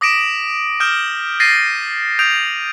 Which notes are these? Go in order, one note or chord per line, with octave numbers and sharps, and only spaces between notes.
D6 D#6 A#6 B6 D7 E7
D#6 F6 G6 D7 E7 G7
A6 A#6 C7 D#7
D#6 G6 D7 F7